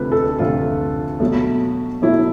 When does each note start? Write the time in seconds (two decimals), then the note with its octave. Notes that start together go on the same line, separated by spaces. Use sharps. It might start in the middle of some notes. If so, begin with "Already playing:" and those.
Already playing: D2 C3 F3 A3 B4
0.12 A4
0.38 D2 C3 F3 A3 F4
1.20 B2 F#3 A3
2.02 B2 F#3 A3 E4